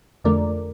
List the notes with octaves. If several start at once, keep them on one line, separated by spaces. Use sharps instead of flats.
F2 D3 F3 A3 A#4 D5